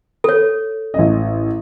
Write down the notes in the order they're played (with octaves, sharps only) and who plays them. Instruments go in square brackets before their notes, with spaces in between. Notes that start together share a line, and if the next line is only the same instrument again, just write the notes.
[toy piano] A4 C#5
[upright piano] A1 D#5